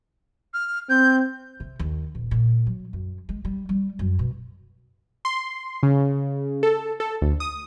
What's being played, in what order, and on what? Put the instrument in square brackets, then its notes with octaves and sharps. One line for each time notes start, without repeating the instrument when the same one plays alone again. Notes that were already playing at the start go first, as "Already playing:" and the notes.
[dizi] F6
[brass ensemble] C4 [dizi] G6
[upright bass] C3
D#2
D#1
A#2
F#3
F#2
G#3
G3
G3
F#2
B2
[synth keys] C6
C#3
A4
A4
D2
D#6